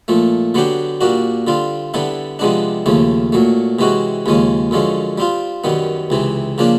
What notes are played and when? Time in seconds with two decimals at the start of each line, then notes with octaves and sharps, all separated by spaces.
0.08 A#2 F3 A3
0.54 D3 F#3 B3 D4 G4
1.01 A#2 G3 A#3 D4 F#4
1.47 D3 G3 C4 F4
1.94 D3 G3 B3 E4 A4
2.39 C3 F3 G#3 B3 D4
2.86 D#2 C#3 F3 A3
3.32 A#2 F#3 A3
3.79 C3 E3 G#3 C#4 F#4
4.26 D#2 C#3 F3 G#3 C#4
4.71 F#2 D3 F3 G#3 C#4
5.18 G3 C4 F4
5.64 F#2 D#3 G3 B3
6.10 C#2 C3 E3
6.58 C#3 F3 A#3 D4